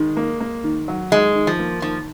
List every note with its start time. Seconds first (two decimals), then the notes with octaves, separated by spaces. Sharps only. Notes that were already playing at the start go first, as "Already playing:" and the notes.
Already playing: D#3 G#3
0.17 A#3
0.40 A#3
0.64 D#3
0.88 F#3
1.12 D#3 G#3
1.35 D#3
1.47 F3
1.59 A#3
1.82 D#3 F3